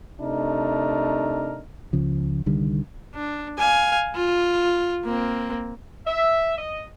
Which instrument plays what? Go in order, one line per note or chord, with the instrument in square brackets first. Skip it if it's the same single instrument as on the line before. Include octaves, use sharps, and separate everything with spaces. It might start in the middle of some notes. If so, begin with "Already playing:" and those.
[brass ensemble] C3 A3 D4 D#4 A#4
[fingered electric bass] C#2 C#3 F3
C2 D3 D#3 G3
[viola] D4
F5 G#5
F4
A#3 C4
[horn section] E5
D#5